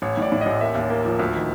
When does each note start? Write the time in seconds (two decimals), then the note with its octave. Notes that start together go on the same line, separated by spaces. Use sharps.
0.02 A1 C#5
0.17 A2 D5
0.32 A2
0.41 A1 D#5
0.61 A#3 E5
0.75 D#2
0.90 A#3
1.05 F3
1.19 D2
1.35 D#3